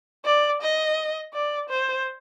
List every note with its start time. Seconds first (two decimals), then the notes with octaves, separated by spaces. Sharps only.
0.25 D5
0.62 D#5
1.33 D5
1.69 C5